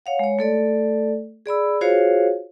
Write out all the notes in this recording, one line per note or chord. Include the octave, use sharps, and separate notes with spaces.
C#5 F5 F#5
G#3 C#5
A3 A4 D5
G#4 D5 B5 E6
F4 F#4 G#4 C5 C#5 F5